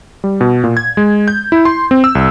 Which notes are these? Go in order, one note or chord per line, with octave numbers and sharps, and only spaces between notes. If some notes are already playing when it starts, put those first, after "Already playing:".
G3
B2
A#2
G#6
G#3
G6
E4
C6
C4
E6
C2